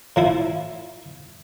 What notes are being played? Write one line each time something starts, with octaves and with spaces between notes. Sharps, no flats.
A2 F3 E4